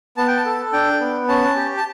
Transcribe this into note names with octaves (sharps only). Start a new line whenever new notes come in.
B3 A5
G5
A5
A4
D4 G5
B3
C#4 A5
G4
A5